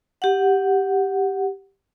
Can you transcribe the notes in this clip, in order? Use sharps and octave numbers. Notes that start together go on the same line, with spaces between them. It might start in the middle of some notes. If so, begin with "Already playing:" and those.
G4 F#5